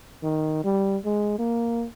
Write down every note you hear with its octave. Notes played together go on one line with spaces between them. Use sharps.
D#3
G3
G#3
A#3